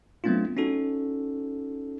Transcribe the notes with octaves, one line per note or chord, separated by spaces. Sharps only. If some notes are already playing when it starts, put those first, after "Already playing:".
F#3 A3 B3 C4 D4 F4
C#4 D#4 F#4 A4